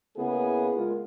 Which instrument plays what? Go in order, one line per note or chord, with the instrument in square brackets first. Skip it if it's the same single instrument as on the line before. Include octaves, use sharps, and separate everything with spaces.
[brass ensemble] C#3 A#3 B3 E4 G#4
G#3 A#3 F4